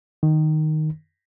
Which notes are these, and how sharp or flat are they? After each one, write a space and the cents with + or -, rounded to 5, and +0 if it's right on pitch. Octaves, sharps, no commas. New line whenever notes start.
D#3 -5